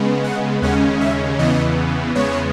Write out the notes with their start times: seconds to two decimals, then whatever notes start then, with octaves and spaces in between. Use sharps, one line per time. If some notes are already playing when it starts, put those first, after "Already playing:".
Already playing: C#3 G#3 B3
0.24 F#5
0.62 D#2 C#3 G#3 C#4 F#5
1.01 E5
1.39 E2 C#3 E3 B3 D#5
2.15 E2 C#3 G#3 B3 C#5